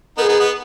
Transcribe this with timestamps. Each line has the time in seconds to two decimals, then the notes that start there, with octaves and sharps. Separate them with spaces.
0.18 B3 D#4 A#4
0.22 G#4
0.28 B3 D#4
0.40 B3